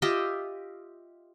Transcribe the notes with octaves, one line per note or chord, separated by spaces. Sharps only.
F4 G4 D#5 E5